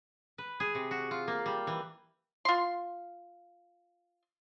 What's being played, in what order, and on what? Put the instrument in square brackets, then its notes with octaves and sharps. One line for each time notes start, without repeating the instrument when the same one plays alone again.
[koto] B4
G#4
C3
F#4
F4
A#3
G3
E3
[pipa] F4 C6